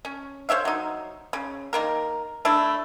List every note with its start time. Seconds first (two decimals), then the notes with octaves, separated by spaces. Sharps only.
0.05 C#4
0.49 C5 C#5 E5 F5
0.65 F#3 D#4
1.33 C#3
1.73 D#3 A#3 A#4
2.45 A3 D4 E4